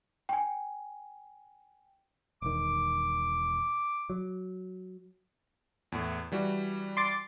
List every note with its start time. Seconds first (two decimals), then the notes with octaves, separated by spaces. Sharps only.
0.29 G5 G#5
2.42 E1 D#3 D6
4.10 F#3
5.92 E2 A2
6.32 E3 G3 F#4
6.97 C6 D6 A6